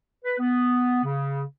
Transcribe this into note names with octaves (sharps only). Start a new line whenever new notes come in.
B4
B3
C#3